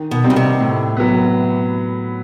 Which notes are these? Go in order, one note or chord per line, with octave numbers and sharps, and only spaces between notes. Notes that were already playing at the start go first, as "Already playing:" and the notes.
Already playing: D#3
B2
G3 C4 D#4
C#3
C3
A2
F#3 B3